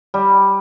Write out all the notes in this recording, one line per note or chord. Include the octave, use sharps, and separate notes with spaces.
G3